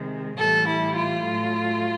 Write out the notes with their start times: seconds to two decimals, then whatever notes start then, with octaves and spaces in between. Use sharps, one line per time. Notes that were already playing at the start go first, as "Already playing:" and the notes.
Already playing: C3 D#3 G#3
0.37 A2 E3 G3 A4
0.66 E4
0.95 F4
1.23 A2 F#3 A3